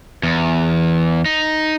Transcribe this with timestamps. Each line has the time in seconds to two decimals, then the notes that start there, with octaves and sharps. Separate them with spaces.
0.23 E2
1.25 D#4